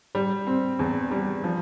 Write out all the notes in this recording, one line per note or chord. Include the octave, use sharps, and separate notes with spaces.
G3
C4
E2
G3
F3